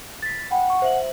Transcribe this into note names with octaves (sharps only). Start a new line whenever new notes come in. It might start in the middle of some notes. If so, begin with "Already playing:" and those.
A6 B6
F#5 G5 B5
C#6
C5 E5 F#7